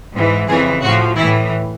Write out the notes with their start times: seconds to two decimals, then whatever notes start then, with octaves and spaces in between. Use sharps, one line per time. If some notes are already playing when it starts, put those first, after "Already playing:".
0.14 G#2 E3
0.48 F2 C#3 E3 G#4
0.82 A2 F3 F#4
1.16 A2 E3 E4